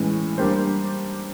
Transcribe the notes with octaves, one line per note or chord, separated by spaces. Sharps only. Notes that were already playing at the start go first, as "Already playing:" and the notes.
Already playing: A2 E3 G#3 C#4
G3 A#3 D4 G4 C5